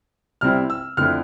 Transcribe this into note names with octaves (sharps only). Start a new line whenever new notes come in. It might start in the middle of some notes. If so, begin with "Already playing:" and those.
C3 G3 C4 E4 F6
E6
F2 D3 A3 E4 F6